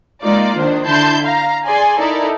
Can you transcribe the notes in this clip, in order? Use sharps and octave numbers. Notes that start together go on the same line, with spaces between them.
G#3 A#3 D#4 F4 D5
D#3 D4 C5
D3 E4 A5 C6 G6
F5 A#5
G#4 D5 G#5 C6
D#4 E4 A4 A#4 D5